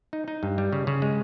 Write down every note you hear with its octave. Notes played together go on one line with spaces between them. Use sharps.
D#4
D#4
G2
G3
C#3
C#3
G#3